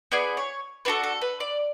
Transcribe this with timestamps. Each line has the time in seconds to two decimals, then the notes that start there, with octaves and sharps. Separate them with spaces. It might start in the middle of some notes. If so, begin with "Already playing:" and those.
0.12 B3 E4 G#4 D5
0.37 C#5
0.85 D4 F#4 A4 B4
1.04 A4
1.21 B4
1.40 D5